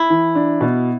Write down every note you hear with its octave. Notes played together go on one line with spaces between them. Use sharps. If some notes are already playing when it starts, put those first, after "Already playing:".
Already playing: E4
E3
D4
B2